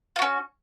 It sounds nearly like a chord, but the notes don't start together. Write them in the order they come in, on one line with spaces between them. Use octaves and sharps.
F4 F#4 C#4